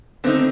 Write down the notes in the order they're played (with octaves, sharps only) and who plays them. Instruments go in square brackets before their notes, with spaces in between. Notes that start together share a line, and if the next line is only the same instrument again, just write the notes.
[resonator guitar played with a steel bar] D3 A3 D#4 [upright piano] C4